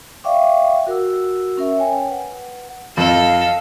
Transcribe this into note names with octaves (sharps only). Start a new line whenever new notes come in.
D5 E5 F5 G5 C#6 D6
F#4 A#4 F#5 E6
C#4 A#4 E5
C#5 G5 G#5
B4 F#5
F2 A4 D#5 F5